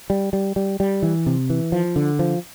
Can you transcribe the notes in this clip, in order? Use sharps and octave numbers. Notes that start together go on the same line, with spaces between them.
G3
G3
G3
G3
E3
C3
E3
F3
D3
F3